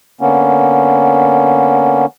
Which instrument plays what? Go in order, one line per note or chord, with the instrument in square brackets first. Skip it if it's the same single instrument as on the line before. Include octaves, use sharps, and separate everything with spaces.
[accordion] D3 A#3 B3 C#4